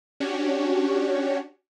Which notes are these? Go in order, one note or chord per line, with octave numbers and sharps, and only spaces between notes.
C#4 D4 F#4 G4 C#5